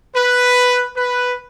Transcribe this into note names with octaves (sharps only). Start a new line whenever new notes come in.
B4
B4